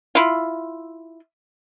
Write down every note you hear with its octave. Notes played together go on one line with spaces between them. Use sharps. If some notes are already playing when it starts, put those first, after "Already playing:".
E4 F4